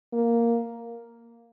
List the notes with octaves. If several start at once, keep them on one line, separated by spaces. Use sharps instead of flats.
A#3